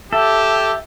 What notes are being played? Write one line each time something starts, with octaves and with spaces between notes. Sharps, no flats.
G4 A4 E5